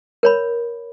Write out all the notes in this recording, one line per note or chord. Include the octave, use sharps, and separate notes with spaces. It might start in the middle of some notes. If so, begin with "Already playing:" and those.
A#4 C#5 B5